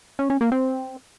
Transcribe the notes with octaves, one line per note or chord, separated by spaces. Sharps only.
C#4
C#4
A#3
C4